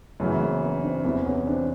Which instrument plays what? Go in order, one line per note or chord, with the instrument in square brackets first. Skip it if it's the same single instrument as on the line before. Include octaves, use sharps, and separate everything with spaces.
[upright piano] F#2 C#3 E3 [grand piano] A3 B3
[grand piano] A#3 C4
B3 C#4
C4 D4
[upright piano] E2 C3 E3 [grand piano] A#3 C4
[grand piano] B3 C#4
C4 D4